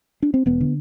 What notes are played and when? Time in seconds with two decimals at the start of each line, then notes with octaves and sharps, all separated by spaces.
0.23 D4
0.34 C4
0.46 E1 B3
0.61 D3